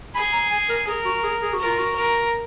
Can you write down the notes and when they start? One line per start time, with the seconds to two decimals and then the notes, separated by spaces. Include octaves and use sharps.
0.15 G#4 B5
0.33 A#5
0.51 G#5
0.69 A#4
0.87 G#4 A#4
1.05 F#4
1.24 G#4
1.42 G#4
1.53 F#4
1.59 A#4
1.66 F4
1.79 F#4
1.95 A#4